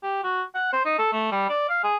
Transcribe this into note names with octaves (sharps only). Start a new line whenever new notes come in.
G4
F#4
F#5
C5
D#4
A4
A3
G3
D5
F5
G#4